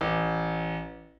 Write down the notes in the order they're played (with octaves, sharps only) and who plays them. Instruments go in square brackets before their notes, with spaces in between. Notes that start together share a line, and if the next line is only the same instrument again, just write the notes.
[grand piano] A1